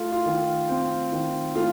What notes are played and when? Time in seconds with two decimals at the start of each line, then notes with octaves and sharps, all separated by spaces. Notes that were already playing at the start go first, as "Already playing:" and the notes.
Already playing: A3 F4
0.12 F4
0.26 D#3
0.69 C4
1.12 D#3
1.55 A3 F4